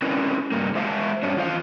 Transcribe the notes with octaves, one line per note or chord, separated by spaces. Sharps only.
C4 C#4 E4 A#4 B4 D5
G2 A#3
G#3 C5 E5 F5 A5
G2 C#4 D4
E2 F4 C5 F5